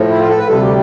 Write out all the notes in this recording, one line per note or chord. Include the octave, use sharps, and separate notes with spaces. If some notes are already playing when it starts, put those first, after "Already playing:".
Already playing: A2 F3
E4
F4
A4
B4
D2 C3 G3 A4
G4